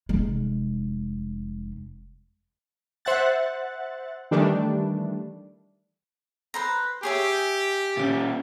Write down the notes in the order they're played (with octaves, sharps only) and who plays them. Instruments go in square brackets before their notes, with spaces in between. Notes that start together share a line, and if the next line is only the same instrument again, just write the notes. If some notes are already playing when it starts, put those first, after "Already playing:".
[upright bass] F1 G#3
[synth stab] C5 E5 F#5 F#6 A6
D#3 E3 G3 A3 D4
[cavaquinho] B4 C5 A#5
[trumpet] G4 [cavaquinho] G#4 C#5 E5
[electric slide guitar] A#2 C#4